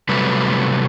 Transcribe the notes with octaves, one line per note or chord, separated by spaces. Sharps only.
C3 F#3 G3 A3 B4